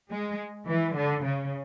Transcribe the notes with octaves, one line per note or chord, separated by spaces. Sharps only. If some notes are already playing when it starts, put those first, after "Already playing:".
G#3
E3
D3
C#3